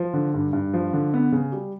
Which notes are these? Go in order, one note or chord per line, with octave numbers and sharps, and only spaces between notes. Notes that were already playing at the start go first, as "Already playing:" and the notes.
Already playing: F3
D3
G2
G2
F3
D3
B3
C#3
G3